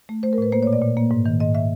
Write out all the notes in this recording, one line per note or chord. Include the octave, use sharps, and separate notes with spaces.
A3
A3 C5
A#4
A2 B4
A#3 C5
C#5
A#2
D5
A#2
A#3
G#2
D#3
G#2 D#5
E5